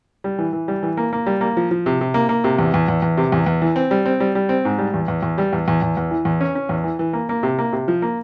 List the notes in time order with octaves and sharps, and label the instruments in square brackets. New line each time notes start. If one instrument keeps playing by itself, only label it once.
[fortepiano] G3
E3
E3
G3
E3
A#3
A#3
G3
A#3
F3
F3
C3
C3
A#3
A#3
C3
E2
E2
E2
E2
C3
E2
E2
E3
C4
G3
C4
G3
G3
C4
G#2
G3
E2
E2
E2
G3
E2
E2
E2
E2
E3
E2
C#4
C#4
E2
E3
E3
A#3
A#3
C3
A#3
C3
F3
A#3